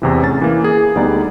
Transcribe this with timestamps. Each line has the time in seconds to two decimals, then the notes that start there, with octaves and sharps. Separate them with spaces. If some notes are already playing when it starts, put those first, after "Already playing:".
0.02 E2 C3 E3
0.21 A2 C#4 A6
0.41 E3 A#3
0.64 G#4
0.95 D2 G3 B3 D#4 D5 A#5